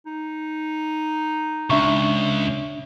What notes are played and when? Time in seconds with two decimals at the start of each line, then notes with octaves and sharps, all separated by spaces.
0.06 D#4
1.70 C#2 D4 E5 C#6